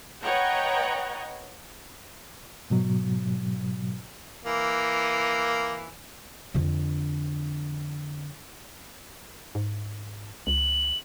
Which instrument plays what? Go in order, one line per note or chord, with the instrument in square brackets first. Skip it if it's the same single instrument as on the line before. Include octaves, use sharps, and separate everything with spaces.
[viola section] B4 C#5 D#5 F#5 G5 A#5
[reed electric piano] G#2 B2 F#3
[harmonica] E3 A#3
[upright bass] F2 D3
[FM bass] G#2
[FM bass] C#2 [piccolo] F#7